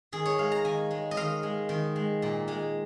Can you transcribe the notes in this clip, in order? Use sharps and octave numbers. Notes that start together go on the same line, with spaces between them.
D#3 G#4
C#5
G#3 F5
A#5
D#3 G#5
G#3
D#5
D#3 F5
G#3
D#3
G#3
A#2
G#3